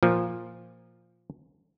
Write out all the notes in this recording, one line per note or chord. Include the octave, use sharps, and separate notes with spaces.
A#2 F3